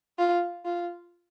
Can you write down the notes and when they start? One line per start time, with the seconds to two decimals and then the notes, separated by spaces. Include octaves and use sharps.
0.18 F4
0.65 F4